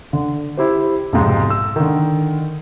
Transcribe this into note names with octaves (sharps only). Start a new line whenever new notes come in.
D3
E4 G4 C5
B1 F2 G#2 C3
E6
D3 D#3